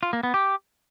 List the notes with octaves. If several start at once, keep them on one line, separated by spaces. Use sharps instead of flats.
F4
A#3
B3
G4